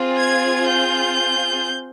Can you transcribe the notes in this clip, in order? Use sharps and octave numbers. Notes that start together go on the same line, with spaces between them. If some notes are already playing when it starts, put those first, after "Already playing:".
Already playing: C4 F4 G#4
G#6
G6